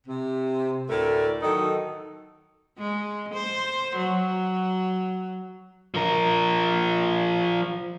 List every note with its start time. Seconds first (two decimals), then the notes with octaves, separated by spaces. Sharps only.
0.07 C3
0.89 D2 A2 A3 A#4 D5
1.43 D#3 F#3 D#4 A4
2.78 G#3
3.34 C5
3.96 F#3
5.94 F3 A#4